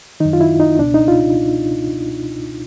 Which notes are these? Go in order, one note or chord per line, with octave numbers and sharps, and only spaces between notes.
F#2 D#3 D#4
F4
E4
D#4
C#2 B2 D4
D#4
F4